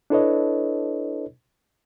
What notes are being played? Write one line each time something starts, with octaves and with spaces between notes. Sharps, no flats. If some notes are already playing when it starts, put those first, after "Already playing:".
D4 E4 A4 B4 C#5 D#5